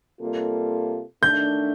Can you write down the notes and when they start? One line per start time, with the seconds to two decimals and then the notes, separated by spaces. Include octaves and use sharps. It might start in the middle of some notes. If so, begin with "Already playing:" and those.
0.21 C3 G3 A#3 F4 A4
1.23 D#3 A3 D4 G6